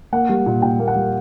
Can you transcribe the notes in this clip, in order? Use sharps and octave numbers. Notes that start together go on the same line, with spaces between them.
A#3 F#5
G3
A#2
A#2 G5
A#3
F#5
G3